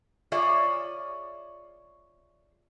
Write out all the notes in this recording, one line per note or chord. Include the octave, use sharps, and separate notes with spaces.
F4 G#4 C#5 D5 E5